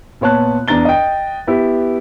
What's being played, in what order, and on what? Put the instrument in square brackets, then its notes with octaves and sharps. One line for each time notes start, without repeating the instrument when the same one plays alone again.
[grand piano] A#2 B3 C#5 A5 F#6
E2 D4 A#5 A6 G7
D#5 G5
B3 E4 G4 B4